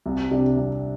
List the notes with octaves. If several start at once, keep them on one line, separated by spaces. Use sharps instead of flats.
C2
C3 G3 D4
C2